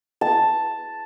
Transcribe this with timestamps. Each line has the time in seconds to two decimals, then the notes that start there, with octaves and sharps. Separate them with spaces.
0.21 A5